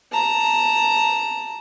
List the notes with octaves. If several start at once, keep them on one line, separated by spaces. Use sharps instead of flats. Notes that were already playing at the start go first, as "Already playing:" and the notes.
A5 A#5